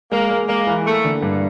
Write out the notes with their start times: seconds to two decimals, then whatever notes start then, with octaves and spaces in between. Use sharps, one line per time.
0.12 G#3 A#3
0.31 G#3
0.48 G#3 A#3
0.67 E3
0.86 A3 A#3
1.04 D3
1.22 G2